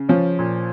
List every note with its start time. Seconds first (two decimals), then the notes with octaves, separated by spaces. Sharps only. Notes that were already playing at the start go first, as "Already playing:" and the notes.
Already playing: C#3
0.09 F3 C#4
0.39 A#2